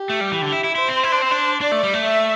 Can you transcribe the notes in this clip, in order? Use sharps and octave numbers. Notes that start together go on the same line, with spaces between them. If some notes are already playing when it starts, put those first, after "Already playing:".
Already playing: G4
A3
G3
E3
D3
E4
E4
E4 C5
C4
E4
D4
C4
D4
D4 D5
A3
G3
A3
E5